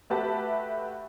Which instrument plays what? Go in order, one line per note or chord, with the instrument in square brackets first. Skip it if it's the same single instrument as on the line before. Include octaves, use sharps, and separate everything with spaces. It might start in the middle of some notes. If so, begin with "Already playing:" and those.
[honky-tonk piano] A3 F#4 G4 B4 E5 A5